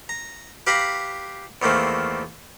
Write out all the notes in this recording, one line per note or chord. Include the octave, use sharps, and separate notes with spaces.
A#5
G4 B4 F5 G5 A#5 B5
E2 D#3 A3 A#3 C4